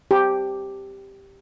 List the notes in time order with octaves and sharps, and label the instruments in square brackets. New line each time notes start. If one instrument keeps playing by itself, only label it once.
[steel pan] G4